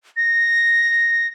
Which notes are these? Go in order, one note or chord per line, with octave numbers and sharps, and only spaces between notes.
A#6